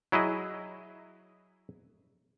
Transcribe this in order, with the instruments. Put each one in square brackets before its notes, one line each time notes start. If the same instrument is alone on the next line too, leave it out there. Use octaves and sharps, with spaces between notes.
[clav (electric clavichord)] F#3 E4 G#4 D#5